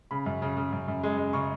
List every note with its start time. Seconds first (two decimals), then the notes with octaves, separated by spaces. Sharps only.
0.11 C#3 B5
0.26 F#2
0.42 C#3
0.57 C#3
0.72 F#2
0.88 F#2
1.03 G#3
1.18 G#3
1.33 C#3 C#6